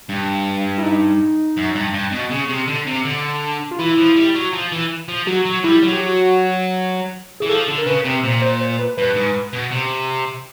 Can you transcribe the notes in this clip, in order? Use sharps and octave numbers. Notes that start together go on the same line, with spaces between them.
G2
E4
D#4
F#2
G2
G2
B2
C#3
C3
D3
C3
D3
F4
E3 E4
F3
G3
F#3
F3
E3
F3
F#3 F#4
F#3
G3 E4
F#3
G4
F#4
E3 G#4
F3 A4
D3
A#4
C#3 B4
C3
A#2 C5
C5
C5
B4
G2 B4
G#2
B2
C3